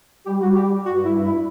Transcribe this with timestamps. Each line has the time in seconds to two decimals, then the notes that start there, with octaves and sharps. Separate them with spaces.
0.25 G3 G4
0.40 G3 F#4
0.55 G3 G4
0.70 G3
0.84 G2 F#4
1.00 G3 E4
1.14 G2
1.24 E4